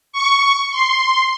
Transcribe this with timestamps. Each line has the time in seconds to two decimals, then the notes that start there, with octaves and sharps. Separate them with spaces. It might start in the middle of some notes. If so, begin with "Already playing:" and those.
0.12 C#6
0.71 C6